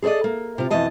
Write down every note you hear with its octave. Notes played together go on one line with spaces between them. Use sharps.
G#4 A4 C5 D5 D#5
A#3
C3 F4
F2 B2 E3 D#5 A5